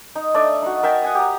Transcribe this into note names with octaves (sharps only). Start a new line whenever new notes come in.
D#4
A3 D4 D5 E5
D#4 F#4
A#4 E5 G5 A5
F#5 G#5 D#6
G4 A#5